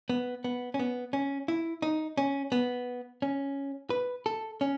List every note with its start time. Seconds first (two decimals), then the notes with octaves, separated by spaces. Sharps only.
0.10 B3
0.44 B3
0.74 C#4
0.79 B3
1.13 C#4
1.48 E4
1.82 D#4
2.17 C#4
2.52 B3
3.22 C#4
3.90 B4
4.26 A4
4.61 C#4